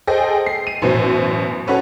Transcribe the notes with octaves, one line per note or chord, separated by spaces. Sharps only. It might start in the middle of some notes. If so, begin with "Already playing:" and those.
G#4 A4 C5 D#5 G5
C7
D#7
A1 F#2 B2 C5
C#4 F#4 A4 B4 C#5